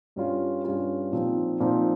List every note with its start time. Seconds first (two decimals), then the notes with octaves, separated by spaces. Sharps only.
0.16 G2 G3 C#4 F4
0.64 G2 G3 C#4 F4
1.12 A#2 F3 C4 D#4
1.60 A#2 F3 C4 D#4